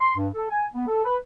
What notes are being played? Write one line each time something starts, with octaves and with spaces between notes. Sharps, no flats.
C6
G2
A4
G#5
B3
A4
B4